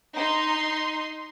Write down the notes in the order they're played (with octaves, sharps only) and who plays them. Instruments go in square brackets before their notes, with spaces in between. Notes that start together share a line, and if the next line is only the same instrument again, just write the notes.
[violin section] D#4 C6